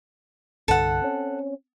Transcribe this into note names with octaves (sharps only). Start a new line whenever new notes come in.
C2 G2 D3 A4 F#5
C4 C#4